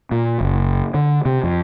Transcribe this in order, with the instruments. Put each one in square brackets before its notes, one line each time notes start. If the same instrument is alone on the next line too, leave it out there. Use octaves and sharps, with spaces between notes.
[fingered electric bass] A#2
F#1
D3
C3
F2